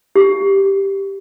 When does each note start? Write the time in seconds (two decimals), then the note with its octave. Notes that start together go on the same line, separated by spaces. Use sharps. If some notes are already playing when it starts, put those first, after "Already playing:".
0.16 G4